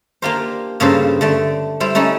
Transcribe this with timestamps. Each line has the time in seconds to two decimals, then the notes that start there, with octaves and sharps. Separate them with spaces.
0.22 A#3 D4 F4 G4 A#4 C5
0.80 G2 C#3 A#3 A4 B4 C5
1.21 D3 A3 D4
1.80 G3 E4 C5
1.95 A3 C#4 D#4 E4